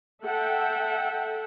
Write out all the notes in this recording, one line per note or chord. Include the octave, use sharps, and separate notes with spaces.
A4 E5 F#5 G5